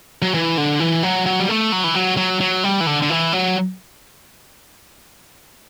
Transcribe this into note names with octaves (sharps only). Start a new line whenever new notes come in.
F#3
E3
D3
E3
F#3
F#3
G3
A3
F#3
E3
F#3
F#3
F#3
G3
E3
D3
D3
E3
F#3